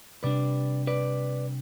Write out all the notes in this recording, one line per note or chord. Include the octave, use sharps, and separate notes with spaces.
C3 G3 D4 B4 D5
B4 D5